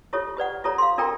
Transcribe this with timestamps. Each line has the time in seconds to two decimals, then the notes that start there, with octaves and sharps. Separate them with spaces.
0.13 E4 F4 G4 A4 C#5
0.37 G4 B4 D5 F#5
0.64 F4 G4 A4 C#5 A#5
0.78 F5 C6
0.98 D4 F4 A4 A#4 G5 A#5